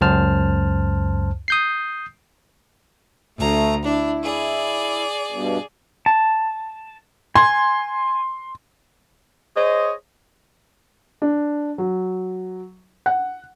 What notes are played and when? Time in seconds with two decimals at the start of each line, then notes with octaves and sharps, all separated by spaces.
0.01 C#2 F#2 C5 A5 F6
1.48 D#6 G6 C7
3.39 D2 A3 A#5
3.85 D4 E4
4.23 G#4 D5
5.31 G2 B2
6.06 A5
7.36 G#5 C6
9.56 G#4 C5 C#5 D#5
11.22 D4
11.78 F#3
13.06 F#5